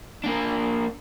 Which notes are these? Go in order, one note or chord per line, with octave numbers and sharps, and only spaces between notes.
A#3 D4